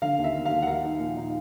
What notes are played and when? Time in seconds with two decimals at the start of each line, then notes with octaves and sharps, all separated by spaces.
0.02 D3 F5
0.18 D#2
0.24 E5
0.34 D#2
0.45 F5
0.51 D#2
0.62 F#5
0.67 A#3 F5
0.84 D#4
1.00 A#2
1.17 D#4